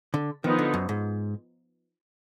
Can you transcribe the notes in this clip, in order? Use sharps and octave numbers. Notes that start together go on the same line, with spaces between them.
D3
D#3 F3 B3 D#4
D3
F#2
G#2